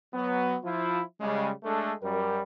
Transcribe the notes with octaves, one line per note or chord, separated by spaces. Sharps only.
F#3 B3
F3 E4 F4
C#3 G3 G#3
G#3 A3 D4 A4
F#2 G3 A#4